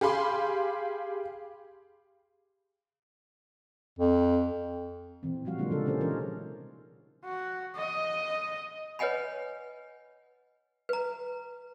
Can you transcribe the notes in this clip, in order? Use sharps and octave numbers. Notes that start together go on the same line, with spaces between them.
G4 G#4 F5 B5 C6 D6
F2
A#2 E3 C4
F3 G3 F#4 F5
D3 F#3 G#3 A#3 D4 F4
A#2 C#3 F3 G3 D4 A4
C3 A#3 C#4 A4 C5
E3 C#4 D#4 F4 G#4 A#4
F#4
D#5
B4 C#5 D#5 F#5 G#5 B5
B4 A#5